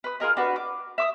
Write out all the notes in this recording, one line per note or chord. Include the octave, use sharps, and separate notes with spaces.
B4 D#6
F4 G#4 A#4 D#5
D4 F#4 B4
D6
E5 D6 D#6